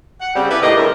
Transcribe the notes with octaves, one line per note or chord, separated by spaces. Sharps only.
F#5
C#3 G3 C4
E4 G4 A4 B4
A2 A#3 D#4 F4 G4 D#5
D2 G2 C#3 E4 A#4